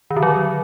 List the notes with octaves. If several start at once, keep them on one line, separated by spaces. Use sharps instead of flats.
D#3
D3
F#3